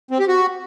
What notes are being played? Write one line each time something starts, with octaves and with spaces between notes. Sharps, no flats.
C4
G4
F#4